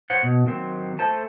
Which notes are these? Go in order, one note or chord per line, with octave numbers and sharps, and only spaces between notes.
C5 C#5 F#5
B2
D#3 F#3 C4
A3 A4 C5 A5